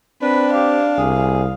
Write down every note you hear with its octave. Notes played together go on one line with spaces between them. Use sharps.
C4 D4 B4
G4 F5
C2 G#4